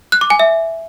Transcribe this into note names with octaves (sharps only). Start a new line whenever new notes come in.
F#6
D6
G#5
E5